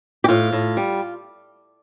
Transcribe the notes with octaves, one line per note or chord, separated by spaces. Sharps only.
G4
A2 F4
A2
G3